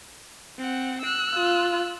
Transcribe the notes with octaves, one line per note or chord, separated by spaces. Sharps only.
C4 F#5
E6 F#6
F4